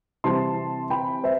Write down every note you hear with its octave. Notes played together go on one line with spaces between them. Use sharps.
C3 E3 G3 C4 A5 C6
G5 B5
C5 E5